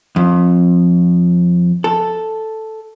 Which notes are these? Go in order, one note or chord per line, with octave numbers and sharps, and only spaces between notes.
F2
A4